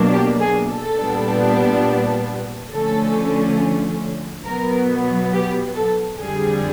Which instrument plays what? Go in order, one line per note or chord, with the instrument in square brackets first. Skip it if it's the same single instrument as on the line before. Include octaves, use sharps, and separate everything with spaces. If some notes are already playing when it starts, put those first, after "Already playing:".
Already playing: [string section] B2 F#3 A#3 D4
G4
G#4
A4
A#2 G3 B3 D4
D3 F3 A3 C#4 A4
B2 F#3 B3 A#4
G4
A4
F2 D3 G3 G#4